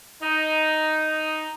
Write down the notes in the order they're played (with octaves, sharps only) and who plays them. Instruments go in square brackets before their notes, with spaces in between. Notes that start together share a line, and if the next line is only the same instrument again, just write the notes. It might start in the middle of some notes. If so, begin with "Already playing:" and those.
[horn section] D#4